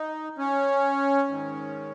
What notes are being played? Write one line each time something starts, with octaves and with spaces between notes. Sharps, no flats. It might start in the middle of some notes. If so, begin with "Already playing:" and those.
Already playing: D#4
C#4
G#2 D#3